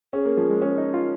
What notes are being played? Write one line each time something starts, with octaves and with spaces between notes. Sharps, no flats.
C#4 G#4
A#3
F3
G#3
C#4
D#4
F4